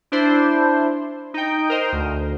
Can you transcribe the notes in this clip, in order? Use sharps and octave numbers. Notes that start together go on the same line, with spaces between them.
D4 E4 C5
D#4 G5
A#4 C5 D#5
D2